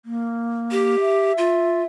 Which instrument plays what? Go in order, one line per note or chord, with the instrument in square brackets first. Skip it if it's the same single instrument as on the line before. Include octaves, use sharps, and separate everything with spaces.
[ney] A#3
[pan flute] G4
[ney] E5
[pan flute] F4